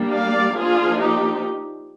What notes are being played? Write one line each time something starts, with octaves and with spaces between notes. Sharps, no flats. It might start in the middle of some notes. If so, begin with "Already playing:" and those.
Already playing: G3 A#3 D4
D5 F5
F3 A#3 D4 F4 G#4
D#4 G4